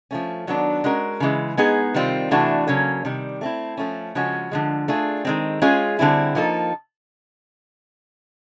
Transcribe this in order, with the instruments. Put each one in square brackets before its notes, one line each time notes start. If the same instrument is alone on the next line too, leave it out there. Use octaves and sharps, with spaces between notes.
[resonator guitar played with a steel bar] F3 A3 C#4
D#3 F#3 B3 D4
G#3 C#4 F#4 A#4
C#3 E3 G#3
G#3 B3 D#4 G#4
C3 D#3 G3 C4 F4
C3 E3 A3 D4 F#4
C#3 F#3 A#3 C#4
C3 D#3 G3
A3 C4 E4
F3 A3 C#4
C#3 F3 G#3 C#4 F#4
D3 F3 G#3
A3 D4 F4 G#4
D#3 G#3 C4
G#3 C#4 F4 G#4
D3 G3 C4 E4 G#4
F3 A#3 D#4 F#4 A4